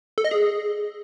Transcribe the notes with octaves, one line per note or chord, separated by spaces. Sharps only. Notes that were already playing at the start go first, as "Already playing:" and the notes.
A4
D#5
G#4